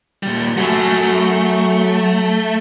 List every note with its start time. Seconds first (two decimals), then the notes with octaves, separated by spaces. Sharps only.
0.23 A#2 G3
0.57 F#3 A3 G#5